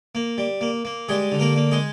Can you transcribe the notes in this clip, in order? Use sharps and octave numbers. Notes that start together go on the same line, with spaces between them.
A#3
G3
A#3
A#3
G3 G#3 G#4
D3
A#3 A#4
A#3
G#3 G#4